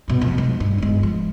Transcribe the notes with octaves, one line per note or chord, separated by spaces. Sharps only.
G2 B2
F2
G#3
G2
G1 G#3
F3